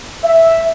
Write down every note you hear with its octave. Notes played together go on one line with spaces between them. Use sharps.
E5